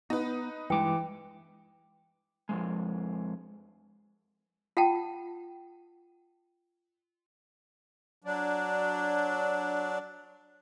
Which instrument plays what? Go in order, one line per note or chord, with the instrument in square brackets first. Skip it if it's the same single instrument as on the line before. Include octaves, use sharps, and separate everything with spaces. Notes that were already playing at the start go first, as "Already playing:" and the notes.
[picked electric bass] B3 [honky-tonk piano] D#4 B4
[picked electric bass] G2 G#3 [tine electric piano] E3 D6 [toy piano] G5
[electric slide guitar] F2 C#3 G#3
[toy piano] F4 F#5 G5 A5
[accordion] F#3 D4